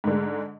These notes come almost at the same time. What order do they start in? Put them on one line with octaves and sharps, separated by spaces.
G#2 D3 G#3